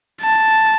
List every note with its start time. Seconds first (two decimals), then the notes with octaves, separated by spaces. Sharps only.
0.22 A5